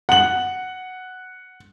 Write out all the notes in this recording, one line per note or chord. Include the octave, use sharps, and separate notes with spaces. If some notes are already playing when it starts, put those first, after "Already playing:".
F#5 F#7